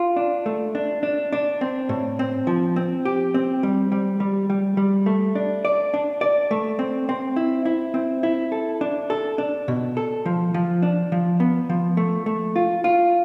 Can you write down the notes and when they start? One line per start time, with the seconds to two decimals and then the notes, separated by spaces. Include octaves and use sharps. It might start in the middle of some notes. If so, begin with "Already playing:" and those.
Already playing: F4
0.16 D4
0.46 A3
0.75 D4
1.03 D4
1.33 D4
1.61 C4
1.89 A2
2.19 C4
2.47 F3
2.76 C4
3.05 G4
3.34 C4
3.63 G3
3.92 G3
4.20 G3
4.50 G3
4.77 G3
5.06 A3
5.35 D4
5.65 D5
5.94 D4
6.21 D5
6.51 A3
6.79 C4
7.09 C4
7.36 E4
7.65 E4
7.94 C4
8.23 E4
8.52 A4
8.81 D4
9.10 A4
9.38 D4
9.68 B2
9.97 A4
10.26 F3
10.54 F3
10.83 D4
11.12 F3
11.40 B3
11.70 F3
11.97 A3
12.26 A3
12.56 F4
12.84 F4